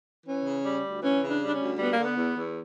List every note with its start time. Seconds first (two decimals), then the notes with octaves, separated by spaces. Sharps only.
0.25 E3 C#4
0.44 C#3
0.63 G3
0.82 D2
1.01 E3 C#4
1.20 C#3
1.27 D4
1.40 G3
1.45 D4
1.53 C#4
1.59 D2
1.78 G3 B3
1.90 A#3
1.97 D3
2.04 B3
2.17 E2
2.36 E2